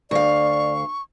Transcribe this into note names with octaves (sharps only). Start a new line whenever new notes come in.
D2 D5 F5 C#6